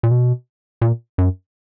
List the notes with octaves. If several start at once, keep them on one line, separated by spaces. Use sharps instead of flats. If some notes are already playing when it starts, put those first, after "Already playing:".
A#2
B2
A#2
F#2